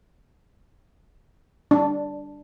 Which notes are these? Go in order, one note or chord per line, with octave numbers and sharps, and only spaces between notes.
D4